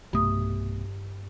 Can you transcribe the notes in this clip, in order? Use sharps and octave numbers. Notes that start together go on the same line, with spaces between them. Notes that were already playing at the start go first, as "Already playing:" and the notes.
B1 G2 C3 A3 D#6